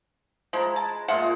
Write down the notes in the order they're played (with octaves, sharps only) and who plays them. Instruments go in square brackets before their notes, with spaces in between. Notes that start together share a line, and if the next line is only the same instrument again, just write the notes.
[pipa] F3 [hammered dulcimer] G#3 E4 A#5
[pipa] A5
[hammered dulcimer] A#2 G#3 F4 [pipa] A3 E5 F#5